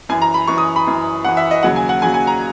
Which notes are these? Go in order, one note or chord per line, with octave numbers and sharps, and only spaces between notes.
F#2 E3 G#5
A#5
B5
F#2 E3 C#6
D#6
B5
F#2 E3
F#2 E3 F#5
E5
D#5
D#2 C#3 F#3 F#5
G#5
F#5
D#2 C#3 F#3 G#5
G#5
A#5